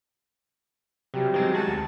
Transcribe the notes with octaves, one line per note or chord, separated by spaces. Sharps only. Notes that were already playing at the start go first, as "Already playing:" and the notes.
C3 F#3 G3 G4
D#3 F#3 G#3 C4
F#4 A5
D2